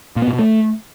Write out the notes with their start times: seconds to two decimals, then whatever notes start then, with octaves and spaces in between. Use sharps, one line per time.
0.16 A#2
0.22 B3
0.28 A#2
0.33 B2
0.39 A3